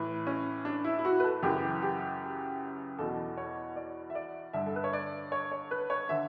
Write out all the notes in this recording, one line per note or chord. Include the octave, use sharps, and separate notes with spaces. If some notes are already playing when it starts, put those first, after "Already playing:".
Already playing: A2 E3
C#4
D4
E4
E4
F#4
B4
A4
F#2 C#3 E3 G4
G4
E2 B2 A4
C#5
D5
E5
D5
G2 D3 E5
A4
B4
C#5
D5
C#5
C#5
B4
C#5
D3 E5